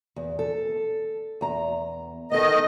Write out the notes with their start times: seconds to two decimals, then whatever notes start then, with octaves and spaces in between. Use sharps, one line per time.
0.16 E2
0.39 A4
1.41 E2 A#5
2.32 D#3 B3 A4 D#5